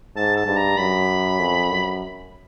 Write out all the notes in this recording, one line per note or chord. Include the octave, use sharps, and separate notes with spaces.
G#2 A5
A5
G2
A#5
F#2 B5
F2
F#2